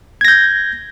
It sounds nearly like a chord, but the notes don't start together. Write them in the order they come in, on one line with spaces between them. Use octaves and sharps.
G#6 A#6 G6